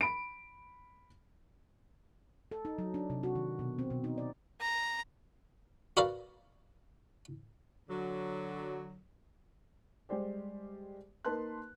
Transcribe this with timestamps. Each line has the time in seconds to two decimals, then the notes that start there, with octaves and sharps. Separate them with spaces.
0.01 B5 D7
2.51 A4
2.65 D#4
2.78 F#3
2.94 D4
3.10 C3
3.23 F#4
3.35 D#3
3.59 B2
3.79 C4
3.90 B2
4.04 D#4
4.18 D5
4.61 A#5
5.97 F#4 A#4 B4 D5 F5
7.90 D3 F#3
10.09 G3 G#3 G4 C5 D5
11.25 A#3 D#4 B4 A5 C6 F#6